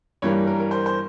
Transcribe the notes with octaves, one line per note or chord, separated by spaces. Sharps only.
G2 E3 G3 A#3 C#5
A#4
A#4
C5
C5